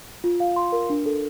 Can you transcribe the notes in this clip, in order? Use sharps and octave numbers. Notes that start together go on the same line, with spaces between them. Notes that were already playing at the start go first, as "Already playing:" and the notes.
F4
F5
C6
A#4
D4
A4